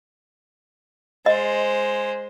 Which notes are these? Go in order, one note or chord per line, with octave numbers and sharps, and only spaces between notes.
G#3 C5 D#5